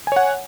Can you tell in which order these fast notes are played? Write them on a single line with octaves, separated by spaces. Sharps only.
G#5 C#5 F#5